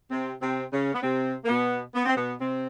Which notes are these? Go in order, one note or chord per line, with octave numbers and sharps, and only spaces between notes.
C3 C4
C3 C4
C#3 C#4
B3
C3 C4
A#3
B2 B3
B3
C4
B2 B3
C3 C4